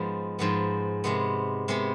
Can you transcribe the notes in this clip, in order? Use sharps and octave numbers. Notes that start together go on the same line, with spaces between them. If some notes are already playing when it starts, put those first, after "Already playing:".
Already playing: G#2 F3 G#3 B3
G#2 F3 G#3 B3
C3 G#3 B3
C3 G#3 B3